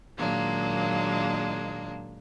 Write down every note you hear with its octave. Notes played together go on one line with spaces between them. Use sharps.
A#2 D#3 F#3 G#3 A#3 D4